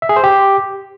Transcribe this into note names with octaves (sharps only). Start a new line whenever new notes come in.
E5
G#4
C5
G4